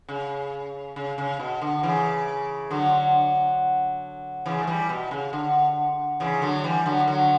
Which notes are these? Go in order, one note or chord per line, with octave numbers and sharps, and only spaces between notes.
C#3
C#3
C#3
B2
D3
C#3 E3
D3 F#3
C#3 E3
A3
E3 G3
B2
C#3
D3
C#3 E3
D3 F#3
E3 G3
D3 F#3
D3 F#3